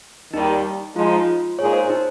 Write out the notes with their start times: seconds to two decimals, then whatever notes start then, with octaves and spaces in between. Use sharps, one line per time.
0.34 D#2 D#3 G3 D#4
0.96 F3 G#3 D#4 F4
1.59 A#2 G#3 D#4 G#4 C#5
1.73 C5
1.90 D#4